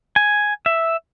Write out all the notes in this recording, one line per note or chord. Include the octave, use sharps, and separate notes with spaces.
G#5
E5